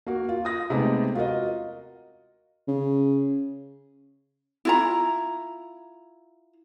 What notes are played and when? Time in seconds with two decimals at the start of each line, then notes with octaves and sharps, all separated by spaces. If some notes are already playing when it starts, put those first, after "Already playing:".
0.06 A#3 F#4
0.29 F4
0.45 D#6 A#6
0.70 C3 G#3 A3 B3 D#4 G4
1.15 F4 F#4 A#4 D#5
2.68 C#3
4.65 E4 F4 A#5